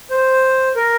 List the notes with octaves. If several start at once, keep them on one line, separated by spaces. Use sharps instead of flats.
C5
A#4